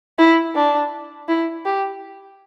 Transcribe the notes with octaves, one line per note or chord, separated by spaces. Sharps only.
E4
D4
E4
G4